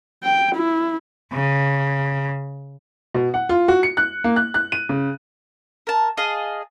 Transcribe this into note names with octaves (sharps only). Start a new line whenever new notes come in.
G5
E4
C#3
B2
F#5
F4
F#4
C#7
F#6
A#3
F#6
F#6
D#7
C#3
A#4 A5
G#4 D#5 F5 A5